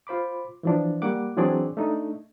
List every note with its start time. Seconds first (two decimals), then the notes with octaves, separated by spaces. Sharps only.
0.07 F4 C5 B5 D6
0.63 E3 F3 D4
1.02 G3 A#3 F#5 D6
1.37 E3 F#3 C4 D4 G#4 D5
1.77 A3 D4 D#4